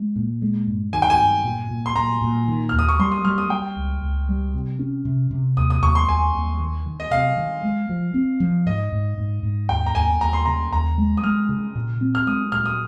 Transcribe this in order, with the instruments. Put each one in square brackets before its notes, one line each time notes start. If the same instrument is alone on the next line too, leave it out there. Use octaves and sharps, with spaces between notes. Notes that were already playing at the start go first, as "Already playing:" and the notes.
Already playing: [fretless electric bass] G#3
A#2
G#3
G2
[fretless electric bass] D#3 [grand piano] G#5
[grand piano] G5
G#5
[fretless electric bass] G2
A#2
A#2
[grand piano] C6
[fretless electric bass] A#2 [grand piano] A#5
[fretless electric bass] A#2
D#3
[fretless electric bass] D#2 [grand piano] F6
[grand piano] D#6
C#6
[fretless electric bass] G3 [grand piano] C6
[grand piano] D#6
[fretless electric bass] G3 [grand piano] F6
[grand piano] D#6
[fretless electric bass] G3 [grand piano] G5
[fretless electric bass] C#2
C#2
G3
C3
C#4
C3
C3
[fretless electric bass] D#2 [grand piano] D#6
[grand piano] D#6
[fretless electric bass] D#2 [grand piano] C#6
[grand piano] C6
[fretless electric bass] D#2 [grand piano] G#5
[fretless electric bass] D#2
D#3
D#3
[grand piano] D#5
[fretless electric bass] C3 [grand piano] F5
[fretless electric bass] D#3
G#3
F3
C4
F3
[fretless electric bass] G#2 [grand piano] D#5
[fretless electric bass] G#2
G#2
G#2
[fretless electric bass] D#2 [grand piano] G5
[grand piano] A#5
[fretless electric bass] D#2 [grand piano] G#5
[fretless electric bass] D#2 [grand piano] A#5
[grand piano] C6
[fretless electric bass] C#3 [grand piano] A#5
[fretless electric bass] D#2 [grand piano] A#5
[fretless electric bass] G#3
[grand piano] D#6
[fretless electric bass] G#3 [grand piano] F6
[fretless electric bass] C#3
A#2
C4
[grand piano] F6
[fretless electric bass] G#3 [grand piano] D#6
[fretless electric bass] A#2 [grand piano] F6
[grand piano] D#6